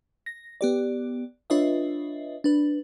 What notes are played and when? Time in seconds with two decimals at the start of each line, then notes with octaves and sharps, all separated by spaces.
0.26 A#6
0.61 B3 G4 D5
1.50 D4 F4 B4 C#5 D#5 E5
2.44 D4 B4